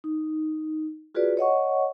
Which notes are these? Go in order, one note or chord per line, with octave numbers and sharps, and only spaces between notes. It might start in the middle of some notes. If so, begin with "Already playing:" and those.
D#4
F4 F#4 G#4 B4 D5
C#5 D#5 F#5 C#6